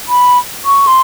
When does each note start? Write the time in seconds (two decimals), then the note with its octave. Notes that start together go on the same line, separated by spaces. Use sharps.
0.09 B5
0.65 C#6
0.87 C6